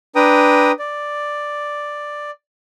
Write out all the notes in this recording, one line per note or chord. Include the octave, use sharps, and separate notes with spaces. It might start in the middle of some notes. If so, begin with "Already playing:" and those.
D4 B4 G5 A#5 D#6
D5